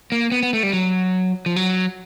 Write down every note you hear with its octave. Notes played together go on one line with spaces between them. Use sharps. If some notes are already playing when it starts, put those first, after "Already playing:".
A#3
B3
B3
A3
G3
F#3
F3
F#3